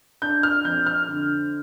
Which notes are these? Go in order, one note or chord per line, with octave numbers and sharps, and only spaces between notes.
D4 G6
F6
F2 G6
F6
D3